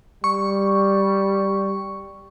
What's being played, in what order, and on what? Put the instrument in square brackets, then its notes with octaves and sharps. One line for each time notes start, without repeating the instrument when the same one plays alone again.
[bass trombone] G3 [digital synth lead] C#6